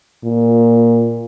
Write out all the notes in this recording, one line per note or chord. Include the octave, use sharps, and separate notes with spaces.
A#2